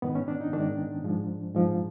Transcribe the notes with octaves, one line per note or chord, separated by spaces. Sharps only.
G#2 D#3 B3
C#4
D4
D#4
G#2 D#3 D4
G#2 F3
G#2 F3